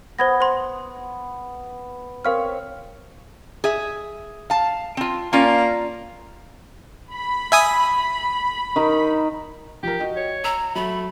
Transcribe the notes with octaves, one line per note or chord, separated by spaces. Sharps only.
B3 C5 G#6 A#6
C5 C6
C4 A#4 C#5 F5 F6
G#4 E5
F5 A5
C4 F4
A#3 C#4 F4 D5
B5
E5 G#5 D#6
D#3 D#4 A#4
F3 G4 A#4
F#4 D#5 G5
C#5
A#5 E6
F#3 A3 B5